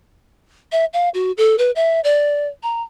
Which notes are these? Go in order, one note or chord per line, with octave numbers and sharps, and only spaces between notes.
E5
F5
F#4
A4
B4
E5
D5
A#5